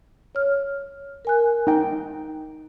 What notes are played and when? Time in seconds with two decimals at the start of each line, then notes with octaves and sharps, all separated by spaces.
0.35 C#5 F6
1.25 A#4 G#5 F#6
1.67 D#4 G5